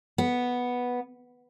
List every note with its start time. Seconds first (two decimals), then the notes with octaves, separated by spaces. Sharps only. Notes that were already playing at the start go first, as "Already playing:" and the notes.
0.18 B3